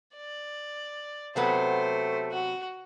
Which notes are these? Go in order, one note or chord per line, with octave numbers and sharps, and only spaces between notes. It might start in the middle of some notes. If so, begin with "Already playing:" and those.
D5
C3 F#3 A3 B3 C5
F#4